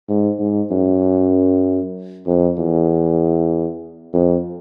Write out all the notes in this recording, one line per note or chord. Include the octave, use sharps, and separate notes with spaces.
G#2
G#2
F#2
F2
E2
F2